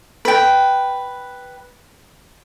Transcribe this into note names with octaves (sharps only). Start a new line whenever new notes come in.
B4 G5